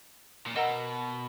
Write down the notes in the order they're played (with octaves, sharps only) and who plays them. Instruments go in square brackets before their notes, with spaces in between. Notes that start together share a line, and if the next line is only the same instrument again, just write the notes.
[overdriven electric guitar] A#2
[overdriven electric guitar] B2 [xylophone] A#4 D#5 F#5 A#5 E6